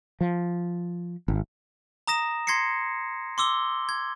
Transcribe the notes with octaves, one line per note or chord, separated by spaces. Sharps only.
F3
G#1
A#5 D#6 A#6 E7
C6 G#6 A#6 C7 C#7
C6 D6 E6 G7
G#6